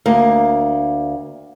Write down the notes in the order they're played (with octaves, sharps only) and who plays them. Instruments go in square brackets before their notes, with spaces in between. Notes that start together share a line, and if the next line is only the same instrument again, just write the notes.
[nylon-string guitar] D2 A#3